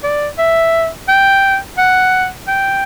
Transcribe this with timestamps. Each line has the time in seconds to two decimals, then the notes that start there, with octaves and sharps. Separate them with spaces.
0.04 D5
0.39 E5
1.08 G5
1.78 F#5
2.48 G5